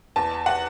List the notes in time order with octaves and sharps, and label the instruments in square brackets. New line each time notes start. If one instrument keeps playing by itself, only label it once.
[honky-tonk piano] E2 A5
F#5